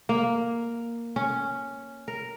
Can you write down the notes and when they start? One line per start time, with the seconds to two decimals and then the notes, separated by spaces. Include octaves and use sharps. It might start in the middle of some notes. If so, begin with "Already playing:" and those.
0.09 A#3
1.16 C#4
2.08 A#4